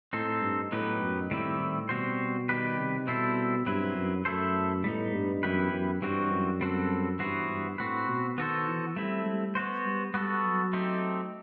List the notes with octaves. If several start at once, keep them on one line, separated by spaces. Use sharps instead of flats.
A2 C4 D#4 A4 C5
G2
A2 F#3 B3 D#4 G4 B4
F#2
A2 D#3 G3 C4 E4 G4
A2
B2 G3 C4 F#4 C5
D#3 G3 D#4 G4 B4
C3
B2 G3 C4 E4 A4 C5
G2 F#3 C4 E4 B4
F#2
F#2 A3 E4 A4 C5
A2 G3 B3 D#4
G2
F#2 E3 B3 E4 G4 B4
F#2
G2 E3 G3 C4 F#4 C5
F#2
G3 C4 F#4 A4
G2 E3 B3 F#4 C5
G2
A2 C4 F#4 B4
B2
D#3 B3 F#4 A4 C5
E3
G3 A3 C4 E4
G3
B3 F#4 C5
G3
G3 B3 F#4 A4
F#3
A3 C4 D#4 G4